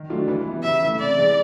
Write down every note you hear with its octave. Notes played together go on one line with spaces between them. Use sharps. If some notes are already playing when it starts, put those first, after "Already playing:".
Already playing: D#3
F#3 A3 D4 F4
E3
G3 B3 E4
C#3 E5
E3 A3
C3 D5
E3 G#3